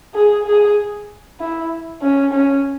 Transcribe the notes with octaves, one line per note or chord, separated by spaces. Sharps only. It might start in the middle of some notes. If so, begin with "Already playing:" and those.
G#4
G#4
E4
C#4
C#4